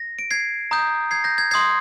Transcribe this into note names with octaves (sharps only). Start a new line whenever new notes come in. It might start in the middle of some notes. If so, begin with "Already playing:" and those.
Already playing: A#6
D7
G#6 C7
A#5 D#6 G6
G#6 C7
G6 A#6
G#6
C6 D#6 G6 G#6 C7